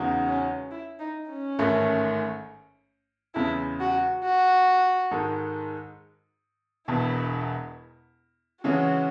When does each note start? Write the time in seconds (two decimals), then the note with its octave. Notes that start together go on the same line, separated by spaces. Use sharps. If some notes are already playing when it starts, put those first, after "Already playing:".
Already playing: E2 C#3 G#3 D#4 F#4
0.26 C#4
0.71 E4
0.99 D#4
1.29 C#4
1.59 A1 G#2 D#3 A3
3.34 E2 C#3 G#3 E4
3.80 F#4
4.23 F#4
5.11 G#2 D#3 G#3 D#4 A4
6.88 E1 E2 B2 E4
8.64 C#3 E3 G#3 C#4 F#4